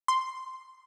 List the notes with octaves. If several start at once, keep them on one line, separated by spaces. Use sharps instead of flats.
C6